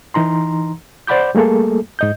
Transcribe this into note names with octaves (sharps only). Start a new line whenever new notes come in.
E3 D#4 A#5 C6
C5 D5 F#5 B5 D6 G6
G3 A3 A#3 G#4 A4
G#2 D#5 G6